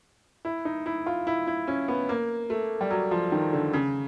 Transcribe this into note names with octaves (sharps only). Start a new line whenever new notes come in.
E4
D#4
E4
F4
E4
E4
C#4
B3
A#3
A3
G3
F#3
F3
D#3
D3
C#3